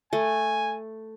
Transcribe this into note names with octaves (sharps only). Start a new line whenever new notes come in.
A3 G#5